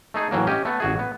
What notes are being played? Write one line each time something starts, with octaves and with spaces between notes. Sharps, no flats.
A3 D#4 G#4
A2 E3 F#3 A#3
C#4 G4 D#5
A3 B3
A1 F#4 G#4
B3